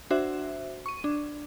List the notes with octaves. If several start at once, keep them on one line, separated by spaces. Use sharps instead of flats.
D4 F#4 C5 E5
C#6 D#7
D4